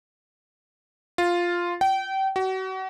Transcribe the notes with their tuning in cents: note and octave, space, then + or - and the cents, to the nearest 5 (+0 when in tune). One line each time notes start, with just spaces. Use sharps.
F4 +0
G5 -30
F#4 +35